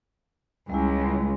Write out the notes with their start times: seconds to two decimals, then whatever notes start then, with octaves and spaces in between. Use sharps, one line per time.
0.70 C#2 G3 G#3 E4